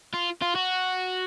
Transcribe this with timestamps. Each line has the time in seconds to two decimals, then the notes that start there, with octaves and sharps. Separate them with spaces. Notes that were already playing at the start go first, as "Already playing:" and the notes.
0.14 F4
0.42 F4
0.55 F#4